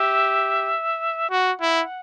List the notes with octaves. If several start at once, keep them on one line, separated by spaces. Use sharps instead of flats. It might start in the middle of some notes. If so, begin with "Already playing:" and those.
Already playing: G4 E5
F#4 F#5
E4